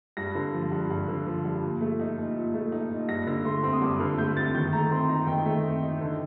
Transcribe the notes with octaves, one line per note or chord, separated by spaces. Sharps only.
G2 A#6
D3
F3
G2
G2
D3
F3
G2
A#2
A3
D#4
A#2
A#2
A3
D#4
A#2
G2 A#6
D3 A#6
A3 C6
C4 C6
D#6
G2 D6
D3 F6
A3 G6
C4 A6
D#3 G6
A3 A#5
C4 C6
D#4 A#5
D#3 G5
A3
C4
D#4
D3